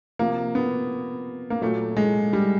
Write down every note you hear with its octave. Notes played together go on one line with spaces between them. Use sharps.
C3 F3 A#3
B3
A#3
A#2 F#3 A3
G#3
G3